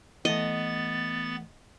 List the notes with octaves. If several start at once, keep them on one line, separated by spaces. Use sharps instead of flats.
E3 A3 B3 D#5 A6